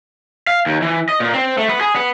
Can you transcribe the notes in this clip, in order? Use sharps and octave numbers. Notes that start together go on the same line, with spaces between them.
F5
D#2
E3
D#5
A#2
C4
A3
B3
G#4
B3